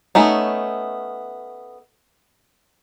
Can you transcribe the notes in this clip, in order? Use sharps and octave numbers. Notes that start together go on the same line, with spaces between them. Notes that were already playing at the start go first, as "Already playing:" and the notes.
A3 B3 C#4 D#4